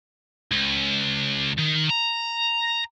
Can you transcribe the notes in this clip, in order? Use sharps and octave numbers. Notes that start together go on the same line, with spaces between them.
C#2
D#3
A#5